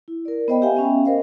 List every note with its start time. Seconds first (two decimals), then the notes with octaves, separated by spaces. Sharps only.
0.08 E4
0.25 A#4 D5
0.48 B3 C5 D#5 G5 B5
0.62 G4 E5 F5 G5 G#5
0.77 B3 C#4 E5
1.05 A#4 C5 D#5 F5